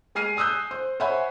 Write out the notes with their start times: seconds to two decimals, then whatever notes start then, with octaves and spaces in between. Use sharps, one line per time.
0.15 G#3 G#5 F6 C7 D#7
0.37 G#5 D#6 E6 F#6 G6
0.71 C5
1.00 C5 C#5 E5 F#5 G#5 B5